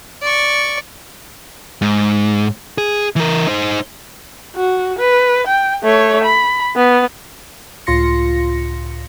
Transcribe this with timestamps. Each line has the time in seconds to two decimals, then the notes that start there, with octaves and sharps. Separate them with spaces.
0.22 D5 C#6
1.82 G#2
2.78 G#4
3.16 E3 A#4
3.47 D#4 C5
4.56 F#4
4.99 B4
5.47 G5
5.83 A3 C#5
6.24 B5
6.76 B3
7.87 C#2 A2 F4 C6 A#6 C#7